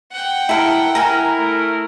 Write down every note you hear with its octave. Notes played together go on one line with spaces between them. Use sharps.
F#5 G5
E4 A4 A#4
E4 A#4 G#5 A#5
A3